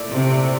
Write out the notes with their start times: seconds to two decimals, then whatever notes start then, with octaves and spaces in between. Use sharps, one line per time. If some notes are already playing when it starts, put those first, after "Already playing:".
Already playing: A#2 A3 E4 A4 D5
0.12 C3